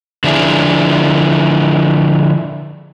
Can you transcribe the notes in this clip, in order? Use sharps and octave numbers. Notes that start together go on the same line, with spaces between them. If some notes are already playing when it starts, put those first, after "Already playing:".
D3 F3 D4 E4 G#4